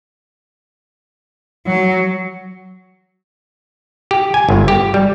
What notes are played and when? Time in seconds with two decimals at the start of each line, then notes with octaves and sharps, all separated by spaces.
1.66 F#3
4.11 G4
4.34 G#5
4.49 G1
4.68 G4
4.94 G3